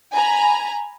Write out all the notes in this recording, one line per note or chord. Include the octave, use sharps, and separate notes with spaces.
G#5 A#5 B5